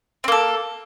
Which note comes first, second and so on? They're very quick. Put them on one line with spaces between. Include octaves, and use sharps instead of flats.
C4 A#3 A4